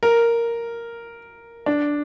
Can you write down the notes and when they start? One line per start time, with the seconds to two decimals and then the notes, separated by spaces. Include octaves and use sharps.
0.03 A#4
1.66 D4